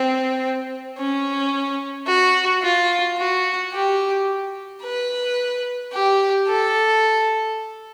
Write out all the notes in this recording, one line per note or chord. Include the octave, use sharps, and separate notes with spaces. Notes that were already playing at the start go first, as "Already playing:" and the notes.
Already playing: C4
C#4
F#4
F4
F#4
G4
B4
G4
A4